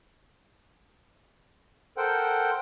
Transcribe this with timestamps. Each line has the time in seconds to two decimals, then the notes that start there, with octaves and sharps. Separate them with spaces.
1.97 A4 A#4 C5 F#5 G5